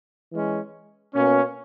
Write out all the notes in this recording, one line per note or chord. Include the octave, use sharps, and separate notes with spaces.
E3 G#3 C#4
B2 A#3 C#4